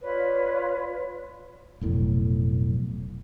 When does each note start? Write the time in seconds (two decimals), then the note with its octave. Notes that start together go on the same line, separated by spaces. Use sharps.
0.03 F4 B4 C#5 D5
1.81 F1 B1 A2